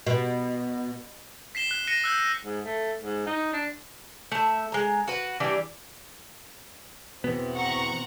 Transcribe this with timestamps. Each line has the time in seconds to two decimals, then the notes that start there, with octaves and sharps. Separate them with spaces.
0.07 B2
1.55 B6 C7 E7 G7
1.71 F#6
1.87 F#6 A#6 C#7 D#7 E7
2.04 E6 F#6 G6
2.44 G#2
2.65 A3
3.03 G#2
3.26 D#4
3.53 D4
4.32 A3 E5
4.72 G#3 A#5
5.08 F#4 B4
5.40 E3 G3 D4 G4
7.24 E2 B2 E3 B3 C4
7.54 F#5 A#5 C#6